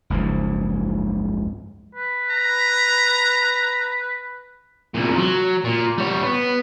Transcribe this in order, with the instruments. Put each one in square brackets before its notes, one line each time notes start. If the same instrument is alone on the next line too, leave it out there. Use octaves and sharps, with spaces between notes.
[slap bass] F#1 C#2 G#2 F3
[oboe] B4
[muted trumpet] A#5
[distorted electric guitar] C2 A#2
F#3
A#2
G3 C#5
B3